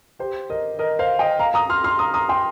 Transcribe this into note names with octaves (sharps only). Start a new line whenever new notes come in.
G4 C5
A#4 D#5
A#4 D#5
C5 F5
D#5 G5
F5 A#5
A#5 D#6
C6 F6
C6 F6
A#5 D#6
A#5 D#6
G5 C6